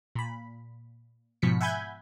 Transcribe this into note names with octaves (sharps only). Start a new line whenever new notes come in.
A#2 B5
G#2 B2 F3 B6 C#7
E5 F#5 G#5 B5 G6 G#6